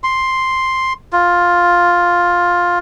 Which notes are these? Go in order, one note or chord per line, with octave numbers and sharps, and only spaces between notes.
C6
F4